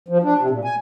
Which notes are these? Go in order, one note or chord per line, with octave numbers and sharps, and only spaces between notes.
F3
D4
C3
A#2
G#5